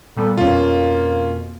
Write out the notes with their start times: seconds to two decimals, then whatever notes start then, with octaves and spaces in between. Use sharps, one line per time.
0.17 A#2 G3 B3 A4
0.37 F2 B2 A#3 C#4 F4